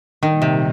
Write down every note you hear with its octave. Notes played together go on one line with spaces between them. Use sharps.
A#2 D#3 G3 A#3 D#4
C3